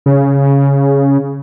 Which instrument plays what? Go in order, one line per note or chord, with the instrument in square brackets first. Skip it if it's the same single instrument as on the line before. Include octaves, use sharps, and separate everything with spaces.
[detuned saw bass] C#3